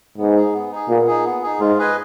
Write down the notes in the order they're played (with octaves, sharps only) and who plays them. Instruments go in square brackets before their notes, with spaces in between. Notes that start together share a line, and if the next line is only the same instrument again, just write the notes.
[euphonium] G#2 [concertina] B3
[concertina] D#4 G#4
B3
D#4 G#4
[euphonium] A#2 [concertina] B3
[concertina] D#4 G#4
B3
D#4 G#4
[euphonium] G#2 [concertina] F4
[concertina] G#4 B4 D#5 G#5